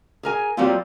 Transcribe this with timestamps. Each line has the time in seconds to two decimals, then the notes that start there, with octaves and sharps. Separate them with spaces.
0.23 G#4 A#4 G#5
0.57 F#3 G3 A#3 C4 F4